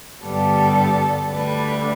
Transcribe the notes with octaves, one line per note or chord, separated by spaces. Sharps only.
G2 D3 G3 B3 A4
D2 D3 G3 B4